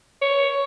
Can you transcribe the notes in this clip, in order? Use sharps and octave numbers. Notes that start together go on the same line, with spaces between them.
C#5